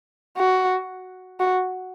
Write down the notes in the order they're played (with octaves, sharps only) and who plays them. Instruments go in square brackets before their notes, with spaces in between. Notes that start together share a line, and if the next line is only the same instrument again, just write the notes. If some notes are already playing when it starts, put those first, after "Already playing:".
[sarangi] F#4
F#4